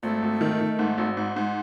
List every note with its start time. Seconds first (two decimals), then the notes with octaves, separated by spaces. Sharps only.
0.03 G#1 A3
0.23 G#1
0.41 D#3
0.61 D#3
0.79 G#2
0.98 G#1
1.17 G#2
1.36 G#2